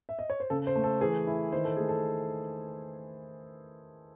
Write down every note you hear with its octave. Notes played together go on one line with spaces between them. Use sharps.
E5
D#5
C#5
C5
C#3 A4
C5
A3
A4
E3 G#4
E4
D#3 C5
A4
A3 G#4
A4